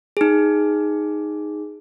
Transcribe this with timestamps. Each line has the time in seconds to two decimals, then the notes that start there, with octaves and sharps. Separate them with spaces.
0.17 D#4 G#4